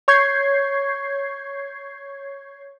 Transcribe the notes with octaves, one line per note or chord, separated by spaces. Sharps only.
C#5 C#6 G6 G#6 C7